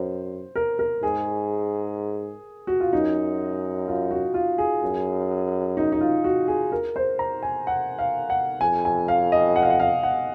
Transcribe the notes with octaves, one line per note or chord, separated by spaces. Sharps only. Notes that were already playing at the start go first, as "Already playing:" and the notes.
Already playing: F#2 C5
A#4
A#4
G#2 G#4
F#4
F4
F#2 D#4
F4
F#4
F4
G#4
F#2
D#4
D#4
F4
F#4
G#4
A#4
C5
A#5
G#5
F#5
F5
F#5
F2 G#5
G#5
F5
D#5
F#5
F5
F#5
F5
F#5